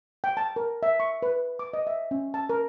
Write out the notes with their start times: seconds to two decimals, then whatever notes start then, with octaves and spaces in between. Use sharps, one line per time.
0.24 G5
0.37 A5
0.56 A#4
0.83 E5
1.00 C#6
1.22 B4
1.59 D6
1.73 D#5
1.87 E5
2.11 C#4
2.34 A5
2.49 A#4